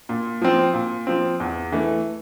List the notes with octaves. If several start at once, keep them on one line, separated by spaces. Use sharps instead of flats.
A#2
F3 C4
A#2
F3 C4
E2
E3 A3